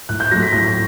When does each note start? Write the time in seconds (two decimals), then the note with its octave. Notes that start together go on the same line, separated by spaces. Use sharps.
0.09 A2 F#6
0.20 G6
0.31 F#3 A3 A#6
0.43 B6
0.53 A2 A#6